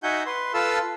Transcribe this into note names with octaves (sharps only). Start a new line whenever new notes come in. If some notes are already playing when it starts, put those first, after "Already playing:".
D#4 F#4 E5 F#5 G#5 G6
B4 C6
F4 A4 B4 F5 A5 E6